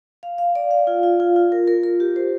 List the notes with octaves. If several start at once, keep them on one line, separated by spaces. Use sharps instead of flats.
F5
F5
D5
F5
F4
F4
F4
F4
A#4
A#4
A#4
G4
C5